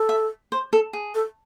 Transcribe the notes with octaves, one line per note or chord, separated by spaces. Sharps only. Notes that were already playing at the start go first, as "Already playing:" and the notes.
Already playing: A4
E5
C5
A4
G#4
A4